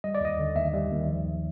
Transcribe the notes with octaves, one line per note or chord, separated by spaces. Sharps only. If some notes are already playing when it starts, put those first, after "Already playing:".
G3 D#5
D5
D#2 D#5
D3
D#2 E5
G3
D#2
F3